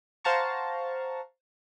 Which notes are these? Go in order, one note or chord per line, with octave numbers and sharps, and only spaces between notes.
C5 F5 F#5 A5 A#5 C#6